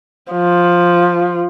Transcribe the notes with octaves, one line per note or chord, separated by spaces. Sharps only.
F3